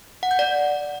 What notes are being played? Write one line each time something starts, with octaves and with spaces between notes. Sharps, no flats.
F#5
G6
D5